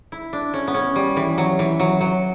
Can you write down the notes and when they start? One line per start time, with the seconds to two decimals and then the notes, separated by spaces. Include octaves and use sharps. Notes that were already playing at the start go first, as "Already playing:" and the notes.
0.12 E4
0.33 D4
0.54 C#4
0.67 B3
0.74 C#4
0.96 G3
1.17 E3
1.38 F#3
1.59 E3
1.80 F#3
2.01 F#3